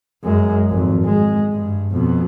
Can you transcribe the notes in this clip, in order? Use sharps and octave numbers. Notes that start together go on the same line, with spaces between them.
F#2 G#3
G#1 F2
G#3
G2
F2 B2